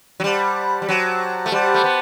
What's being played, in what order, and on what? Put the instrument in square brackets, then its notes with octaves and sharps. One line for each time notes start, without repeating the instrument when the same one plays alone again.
[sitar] F#3
[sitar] G3 [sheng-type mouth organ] G4 C5 F#5 A5
[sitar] G3
[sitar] F#3 [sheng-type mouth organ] G4 C5 F#5 A5
[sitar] A3
[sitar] G3 [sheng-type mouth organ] G4 C5 F#5 A5
[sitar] A3
B3